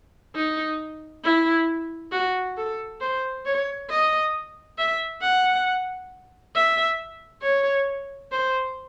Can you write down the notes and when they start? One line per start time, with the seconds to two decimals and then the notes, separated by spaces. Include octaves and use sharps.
0.36 D#4
1.25 E4
2.12 F#4
2.58 A4
3.01 C5
3.46 C#5
3.90 D#5
4.78 E5
5.22 F#5
6.55 E5
7.43 C#5
8.32 C5